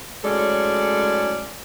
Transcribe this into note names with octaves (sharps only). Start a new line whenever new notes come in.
A2 F#3 G#3 C#4 A4 D5